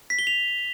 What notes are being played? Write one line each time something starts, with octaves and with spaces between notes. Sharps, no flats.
B6
G7
F7